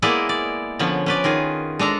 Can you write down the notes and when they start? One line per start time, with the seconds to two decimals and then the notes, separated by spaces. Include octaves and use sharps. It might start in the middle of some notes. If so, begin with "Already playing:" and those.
0.02 G#3 A#3 B3 E4 G#4 D5
0.29 D5
0.79 D3 F3 B3 C#4
1.06 C#4 B4 D5
1.24 D#3 F4 G#4
1.79 G#3 D4 A4 A#5